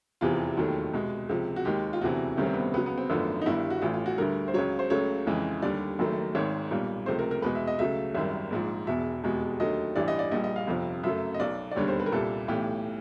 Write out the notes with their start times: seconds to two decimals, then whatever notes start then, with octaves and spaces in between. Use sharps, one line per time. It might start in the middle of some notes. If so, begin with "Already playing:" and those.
0.21 F1 E2 C3 E3 F4
0.57 E1 D#2 D#3 F#3 A3
0.93 C2 B2 G#3
1.29 C#2 C3 F3
1.56 F#4
1.65 D#2 D#3 G#3 G4
1.93 F4
2.01 E1 D2 C3 E3 F#4
2.37 D2 C3 D#3 G3 C#4
2.46 C4
2.54 B3
2.61 C4
2.74 C#2 C#3 F#3 B3
2.86 B3
2.98 C4
3.10 G#1 F#2 D3 F3 A3 B3
3.41 D#4
3.46 G1 G2 D#3 G3 E4
3.70 F#4
3.82 A1 A2 E3 F4
3.94 F4
4.06 F#4
4.18 D2 D3 G3 A#4
4.48 C5
4.54 C#2 C#3 F#3 C#5
4.79 C5
4.90 C#2 C#3 F#3 A3 C#5
5.26 F2 C#3 E3 G#3
5.62 D#2 D3 G3 D5
5.99 F#1 F#2 D#3 F#3 A3
6.35 G#1 G#2 D#3 C#5
6.71 B1 A#2 G3
7.06 C#2 C3 F3 A3 C5
7.19 A#4
7.31 A#4
7.42 E2 B2 G#3 B4
7.55 E5
7.67 D#5
7.79 C#2 C#3 F#3 A3 E5
8.15 G#1 F#2 D#3 G3 E5
8.51 A#1 G#2 F3
8.87 E1 E2 B2 E5
9.23 F1 E2 B2 G#3
9.60 D#2 D3 F#3 A3 D#5
9.96 A1 G2 E3 G3 D5
10.08 D#5
10.19 D5
10.31 A#1 A#2 G3 D#5
10.44 D#5
10.56 F5
10.67 G1 F2 C3 F3
11.03 F#2 C#3 F#3 A3 E5
11.34 D#5
11.39 B1 B2 F#3 D5
11.71 D5
11.76 E1 D#2 D3 G3 C#5
11.88 C5
12.00 B4
12.06 A#4
12.12 C2 A#2 G3 A4
12.48 B1 A2 E3 G4